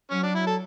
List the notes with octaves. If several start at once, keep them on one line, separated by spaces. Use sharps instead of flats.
F#3 C#4
D4
E4
A4